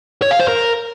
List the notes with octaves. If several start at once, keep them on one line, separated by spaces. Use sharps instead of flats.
C#5
F5
C5
A#4